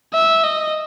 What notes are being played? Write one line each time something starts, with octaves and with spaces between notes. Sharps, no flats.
E5
D#5